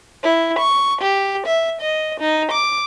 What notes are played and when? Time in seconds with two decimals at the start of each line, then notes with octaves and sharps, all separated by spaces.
0.22 E4
0.58 C#6
1.01 G4
1.45 E5
1.80 D#5
2.20 D#4
2.51 D6